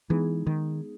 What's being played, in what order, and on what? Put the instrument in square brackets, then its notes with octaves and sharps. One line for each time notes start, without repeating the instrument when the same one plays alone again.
[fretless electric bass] E3 [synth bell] G#3 B3 D#4 G#4
[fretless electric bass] D#3